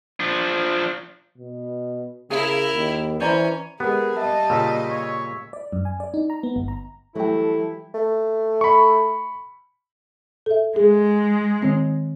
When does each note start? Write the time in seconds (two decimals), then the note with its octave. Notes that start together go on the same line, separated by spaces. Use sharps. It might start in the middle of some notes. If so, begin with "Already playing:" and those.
0.20 F3 D4
1.38 B2
2.30 C#3 E4 G#4 A#4 F5
2.74 D#2
3.20 E3 C#4 C5 D5 A#5
3.80 G#3 B3 G4 G#4 A#4 B4
4.17 G3 D#5 E5 A5
4.50 A#2 C#3 E6 B6
4.90 C#5
5.53 D5
5.72 F#2
5.85 G#5
6.00 D5
6.14 D#4
6.30 A#5
6.43 B3
6.56 G1
6.68 A#5
7.15 E3 F#3 G3 A3 E4 A4 G5
7.94 A3
8.61 B5 C#6
10.46 A4 E5
10.76 G#3 G#4
11.62 D#3 C4